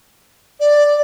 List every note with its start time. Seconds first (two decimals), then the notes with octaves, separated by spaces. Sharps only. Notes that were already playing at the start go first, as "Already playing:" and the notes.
0.60 D5